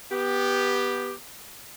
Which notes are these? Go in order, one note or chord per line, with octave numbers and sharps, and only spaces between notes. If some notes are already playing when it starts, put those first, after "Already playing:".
B3 G4